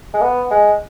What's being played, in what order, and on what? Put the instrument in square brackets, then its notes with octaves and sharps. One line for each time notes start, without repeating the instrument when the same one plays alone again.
[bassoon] G#3
B3
G#3